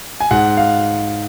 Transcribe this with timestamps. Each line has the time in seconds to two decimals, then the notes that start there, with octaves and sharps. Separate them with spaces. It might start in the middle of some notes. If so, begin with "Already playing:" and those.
0.20 G#5
0.31 G#2 F#5
0.57 F5